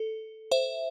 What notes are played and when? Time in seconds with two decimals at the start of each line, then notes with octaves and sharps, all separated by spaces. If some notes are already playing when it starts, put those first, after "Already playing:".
Already playing: A4
0.51 C5 E5